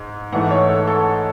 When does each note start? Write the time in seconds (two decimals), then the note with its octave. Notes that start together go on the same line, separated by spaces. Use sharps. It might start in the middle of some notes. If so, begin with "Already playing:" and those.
Already playing: G#2
0.33 G#2 E3 A3 F#5
0.51 C#5
0.69 A4
0.87 A4